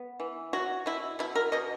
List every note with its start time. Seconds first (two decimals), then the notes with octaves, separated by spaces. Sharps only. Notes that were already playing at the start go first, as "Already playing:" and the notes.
Already playing: B3
0.20 E3
0.53 F#3 F#4
0.86 B2 E4
1.19 B2 E4
1.35 A#4
1.52 B2 D#5